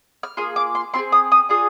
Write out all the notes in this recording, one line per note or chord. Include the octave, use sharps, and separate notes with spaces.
F6
A#3 F4 G#4 D#6
D6
C6
C4 F4 G#4 C6
D#6
D#6
D4 F4 G#4 D#6